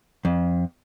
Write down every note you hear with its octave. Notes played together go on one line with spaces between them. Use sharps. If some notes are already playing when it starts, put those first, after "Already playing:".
F2